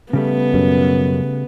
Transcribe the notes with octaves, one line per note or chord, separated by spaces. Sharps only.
C#3 G3 A3 B3
F#2 B2